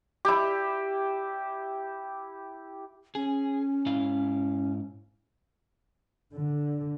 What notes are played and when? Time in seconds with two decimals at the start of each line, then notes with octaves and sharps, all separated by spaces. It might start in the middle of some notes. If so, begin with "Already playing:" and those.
0.25 E4 G4
3.15 C#4 G#4
3.86 G#2 E4 F5
6.33 D3